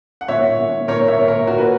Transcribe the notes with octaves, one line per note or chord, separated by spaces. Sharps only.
F#5
A#2 C#5 E5
A#2
A#2
A#2 A#4 C#5
A#2 C#5 E5
A#2 A#4 C#5
A#2 F#4 A#4
B4